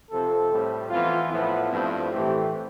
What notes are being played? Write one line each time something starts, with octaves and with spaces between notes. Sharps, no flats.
F2 C3 F3 C4 A4
A2 G3 C4
F2 E3 B3 F4
A2 F3 B3 E4
G2 F3 A3 C4
A2 E3 A3 C4 G4